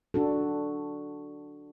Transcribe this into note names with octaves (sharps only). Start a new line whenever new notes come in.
D4 F#4 A4